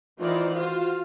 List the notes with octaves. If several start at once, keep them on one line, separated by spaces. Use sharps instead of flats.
D#3 E3 D#4 F4 C5 D5
F4 F#4 C5 F5